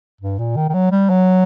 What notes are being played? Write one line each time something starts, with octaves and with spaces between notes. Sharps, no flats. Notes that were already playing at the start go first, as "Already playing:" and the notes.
G2
A#2
D#3
D#3
F#3
G3
F#3